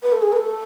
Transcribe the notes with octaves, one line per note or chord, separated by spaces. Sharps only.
B4
A4
G#4
B4
A4